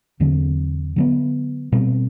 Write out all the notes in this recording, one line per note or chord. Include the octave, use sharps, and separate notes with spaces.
E2 D3 F#3 C4
D3 F#3 B3
B2 G3 C4